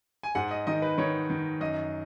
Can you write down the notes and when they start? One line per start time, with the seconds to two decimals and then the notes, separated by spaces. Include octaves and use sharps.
0.23 G#5
0.35 G#2 F#5
0.51 D#5
0.67 D#3 D#5
0.82 B4
0.98 D#3 C#5
1.30 D#3
1.60 F#2 D#5